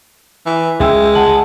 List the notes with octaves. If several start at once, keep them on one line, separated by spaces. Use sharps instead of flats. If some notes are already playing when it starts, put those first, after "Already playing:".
E3
C#2 C#3 G#3 E5 G5 E6
F#5 A5 F#7